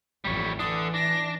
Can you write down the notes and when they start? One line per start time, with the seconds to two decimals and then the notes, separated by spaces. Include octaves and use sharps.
0.25 A1 F2 G3 C#5
0.59 D3 E3 D4 D#6
0.94 D4 A#6